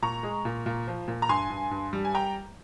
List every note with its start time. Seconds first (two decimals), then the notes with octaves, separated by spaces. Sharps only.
0.02 A#2 A#5 C#6
0.23 G#3
0.45 A#2
0.66 A#2
0.87 F3
1.08 A#2
1.22 A#5
1.29 G2 G#5 C6
1.50 G2
1.71 G2
1.93 G3
2.05 G#5
2.15 G5 A#5